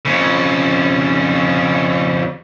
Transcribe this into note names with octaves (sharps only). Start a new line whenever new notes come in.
F2 C#3